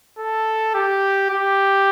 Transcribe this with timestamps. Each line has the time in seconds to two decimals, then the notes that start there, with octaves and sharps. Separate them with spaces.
0.18 A4
0.74 G4
1.30 G4